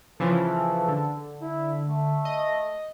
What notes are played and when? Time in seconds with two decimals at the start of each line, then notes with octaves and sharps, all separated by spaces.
0.20 C#3 E3 F3 A4
0.88 D3
1.42 E4
1.89 A3
2.25 D#5